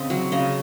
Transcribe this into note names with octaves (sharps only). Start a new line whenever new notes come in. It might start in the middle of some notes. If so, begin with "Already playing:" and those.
Already playing: C#3 C4 D#5
F#3
C#3 D#5